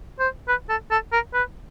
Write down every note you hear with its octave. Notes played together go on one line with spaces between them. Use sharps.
C5
B4
A4
A4
A#4
B4